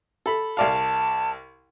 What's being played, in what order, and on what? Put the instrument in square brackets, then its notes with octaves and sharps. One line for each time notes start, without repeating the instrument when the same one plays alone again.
[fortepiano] A4 B5
[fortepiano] C2 D5 F5 [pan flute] A5